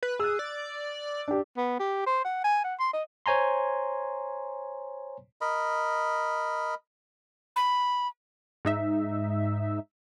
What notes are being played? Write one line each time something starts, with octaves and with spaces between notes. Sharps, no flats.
B4
G#4 E6 F#6
D5
D4 G4
B3
G4
C5
F#5
G#5
F#5
C6
D#5
C5 C#5 G#5 A#5 C6
A#4 D#5 B5
B5
G#2 D#4 E5